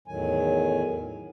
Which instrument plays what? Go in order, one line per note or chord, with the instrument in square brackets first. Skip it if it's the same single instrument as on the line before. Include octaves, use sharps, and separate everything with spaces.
[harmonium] E2 A2 D#3 F#3 G#5